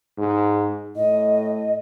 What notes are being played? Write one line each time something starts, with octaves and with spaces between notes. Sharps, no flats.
G#2
A2 D#5